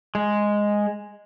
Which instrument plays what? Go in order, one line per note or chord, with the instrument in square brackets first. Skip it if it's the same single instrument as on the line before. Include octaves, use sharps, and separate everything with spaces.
[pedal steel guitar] G#3